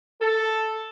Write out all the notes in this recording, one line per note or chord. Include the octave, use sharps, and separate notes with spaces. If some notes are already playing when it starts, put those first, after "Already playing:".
A4